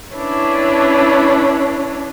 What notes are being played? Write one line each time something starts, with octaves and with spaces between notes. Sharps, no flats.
C#4 D4 E4 B4 C#5